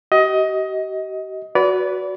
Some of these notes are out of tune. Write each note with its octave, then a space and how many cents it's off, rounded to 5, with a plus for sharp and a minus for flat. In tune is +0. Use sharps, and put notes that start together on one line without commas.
G4 -40 D#5 +20
F#4 +0 B4 +0 D5 -35